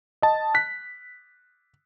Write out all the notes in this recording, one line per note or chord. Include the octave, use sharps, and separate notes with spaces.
D#5 A5
F#6 B6